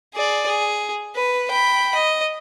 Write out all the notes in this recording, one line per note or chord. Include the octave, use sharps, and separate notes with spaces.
G#4 D5
G#4
B4
G5 B5
D#5